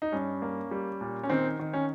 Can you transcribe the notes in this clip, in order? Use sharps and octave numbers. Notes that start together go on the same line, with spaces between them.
D#4
G2 C#4
A#3
G3
A#2
C#4
D#3 C4
D#3
C#4